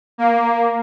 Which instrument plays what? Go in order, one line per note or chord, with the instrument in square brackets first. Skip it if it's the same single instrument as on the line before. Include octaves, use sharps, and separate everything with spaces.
[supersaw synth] A#3